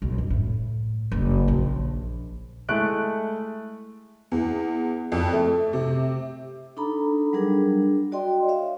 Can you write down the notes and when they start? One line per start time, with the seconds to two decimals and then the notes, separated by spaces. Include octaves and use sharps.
0.02 B1
0.18 F#2
0.30 A2
1.12 F#1
1.48 A#1
2.69 G#3 A3 E4 F#6 D7
4.32 E2
5.12 F2
5.33 A3
5.73 C3
6.77 D4 D#4 A4 A#5 B5
7.33 F#3 G3 D4 G#4 A#4
8.12 F#4 D5 D#5 G5 C6
8.48 C#5 D5 E5 F5